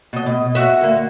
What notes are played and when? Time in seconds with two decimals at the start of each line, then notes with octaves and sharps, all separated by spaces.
0.13 B2 D#5
0.26 B2
0.55 F#4 E5
0.81 D2 A#3